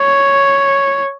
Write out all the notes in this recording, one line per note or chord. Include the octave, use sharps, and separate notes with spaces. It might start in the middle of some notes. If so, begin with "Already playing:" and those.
Already playing: C#5